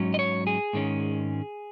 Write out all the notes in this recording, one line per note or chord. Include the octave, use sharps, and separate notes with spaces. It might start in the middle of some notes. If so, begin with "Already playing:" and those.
Already playing: G#2 F#3 C#4
D#5
C#5
G#4
G#2 D#3 G#3 C#4